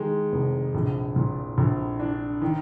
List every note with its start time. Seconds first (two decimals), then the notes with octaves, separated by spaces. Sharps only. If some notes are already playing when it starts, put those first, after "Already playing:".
Already playing: D#3 G#3
0.32 F1
0.75 A#1
1.16 A#2
1.58 A#1
2.00 D4
2.41 D#3